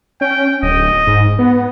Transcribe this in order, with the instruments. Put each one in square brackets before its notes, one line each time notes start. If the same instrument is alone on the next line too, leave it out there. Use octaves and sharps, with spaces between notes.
[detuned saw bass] C#4 [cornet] G5
[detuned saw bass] D1 [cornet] D#5
[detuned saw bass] G#2
B3